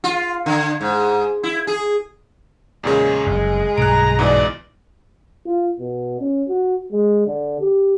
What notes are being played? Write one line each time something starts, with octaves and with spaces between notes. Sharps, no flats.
F4
D3
G#2
E4
G#4
E2 A#2 C#3 G#3
F#1 C2 G#3
B1 G2 D3 G#5 A#5 F#6 D7
G#2 B2 E3 D5 D#5
F4
B2
C#4
F#4
G#3
D3
G4